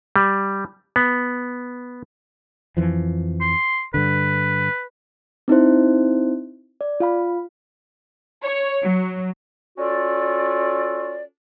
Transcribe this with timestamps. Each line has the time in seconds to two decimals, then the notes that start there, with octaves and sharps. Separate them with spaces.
0.16 G3
0.96 B3
2.77 F2 E3 F3
3.41 C6
3.94 G2 D3 B4
5.48 C4 D#4 E4 C5
6.81 D5
7.00 F4 F5 B5
8.43 C#5
8.84 F#3
9.78 C#4 F4 F#4 A4 D5